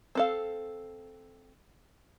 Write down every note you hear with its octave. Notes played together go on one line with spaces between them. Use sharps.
C4 A4 F5